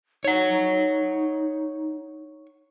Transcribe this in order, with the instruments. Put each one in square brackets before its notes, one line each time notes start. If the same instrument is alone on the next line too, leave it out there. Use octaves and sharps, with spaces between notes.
[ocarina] D#4 [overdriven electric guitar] C#5 F#5